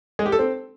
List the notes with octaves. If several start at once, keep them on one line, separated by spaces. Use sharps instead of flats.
G#3
G4
A4
C4